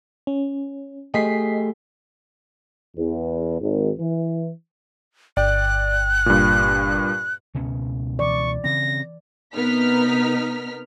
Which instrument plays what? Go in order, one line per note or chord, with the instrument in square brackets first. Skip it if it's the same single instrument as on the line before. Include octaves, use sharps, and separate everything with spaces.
[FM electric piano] C#4
[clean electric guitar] A3 G4 G#4 [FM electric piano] D#5 B6 C7
[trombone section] E2
G#1
E3
[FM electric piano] G1 G5 [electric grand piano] D5 [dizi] F#6
[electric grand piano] G2 A#2
[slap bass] C#2 B2 C#4
[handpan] E3 D5 [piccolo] C#6
[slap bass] C#3 C4 [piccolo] A#6
[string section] C3 B3 D#4 A#4 F6 B6